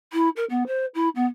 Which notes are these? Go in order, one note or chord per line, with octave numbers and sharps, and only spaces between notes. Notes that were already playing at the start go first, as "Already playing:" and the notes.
E4
A#4
B3
C5
E4
B3